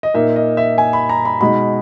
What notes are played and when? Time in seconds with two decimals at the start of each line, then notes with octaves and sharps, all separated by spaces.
0.03 D#5
0.14 A#2 A#3 D#4 E5
0.36 D#5
0.57 E5
0.78 G#5
0.93 B5
1.09 A#5
1.25 B5
1.41 B2 G#3 D#4 B5